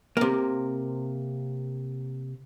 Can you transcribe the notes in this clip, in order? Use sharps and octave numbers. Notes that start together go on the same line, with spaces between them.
C3 A#3